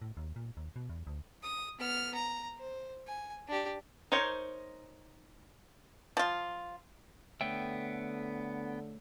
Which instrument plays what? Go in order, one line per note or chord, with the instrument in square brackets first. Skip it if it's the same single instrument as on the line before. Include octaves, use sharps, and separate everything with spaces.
[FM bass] A2
D#2
A#2
D#2
B2
E2
D2
[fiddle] D#6
B3 F6
A#5
C5
G#5
D4 G4
[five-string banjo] D#4 A#4 C5 C#5
[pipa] F3 F4
[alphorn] D3 [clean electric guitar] A3 C#5 E5 [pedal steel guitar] B3 G5